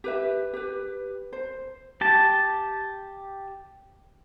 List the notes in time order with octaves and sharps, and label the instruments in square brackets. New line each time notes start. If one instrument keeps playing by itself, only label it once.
[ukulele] G4 B4 E5
G4 B4
C5
[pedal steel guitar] G4 A5